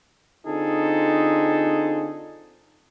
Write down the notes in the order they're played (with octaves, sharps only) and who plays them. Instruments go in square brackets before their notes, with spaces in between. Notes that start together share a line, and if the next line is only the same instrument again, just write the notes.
[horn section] D3 C4 D#4 F4 G#4 A4